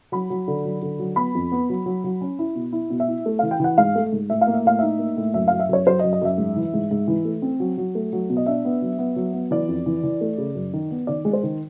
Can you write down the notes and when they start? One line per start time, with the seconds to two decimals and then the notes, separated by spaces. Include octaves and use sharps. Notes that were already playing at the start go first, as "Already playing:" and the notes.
0.12 F#3 B5
0.30 F#3
0.48 D3
0.65 F#3
0.82 D3
0.99 F#3
1.16 B3 B5
1.35 F2
1.52 B3
1.69 F#3
1.86 F#3
2.04 F#3
2.21 C#4
2.39 E4
2.55 B2
2.73 E4
2.90 B2
3.00 E5
3.08 E4
3.26 A3
3.39 E3 F5
3.51 G5
3.60 E3 F#5
3.78 G#2 F5
3.95 A3
4.12 G#2
4.29 A2 E5
4.41 F5
4.47 A#3
4.54 E5
4.65 A2 F5
4.79 D#4 E5
4.99 A#3
5.17 A2
5.34 F#2 E5
5.48 F#2 F5
5.59 E5
5.69 F#2 C#5
5.86 F#3 C5
5.99 F#2 D#5
6.13 D#5
6.22 F#2 E5
6.38 G#2
6.56 E3
6.74 G#2
6.91 G#2
7.08 E3
7.25 A3
7.42 C4
7.60 F#3
7.77 F#3
7.95 A3
8.13 F#3
8.30 B2
8.37 D#5
8.46 D4 E5
8.65 B3
8.82 F#3
8.99 B3
9.16 F#3
9.33 B3
9.51 E3 D5
9.68 F2
9.86 E3
10.03 E3
10.21 A3
10.38 C#3
10.55 F#2
10.73 D#3
10.91 B3
11.07 D#3 D5
11.25 G#3
11.33 C5
11.43 D#3